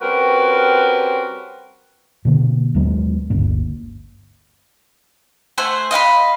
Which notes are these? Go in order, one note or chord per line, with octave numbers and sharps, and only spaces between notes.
G3 C4 C#4 F#4 A#4 B4
B2 D3 A#3
D#2 F#3 G#3 B3
G1 D2 G2 A#3
A3 C5 F#5 G#5
D#5 F5 F#5 B5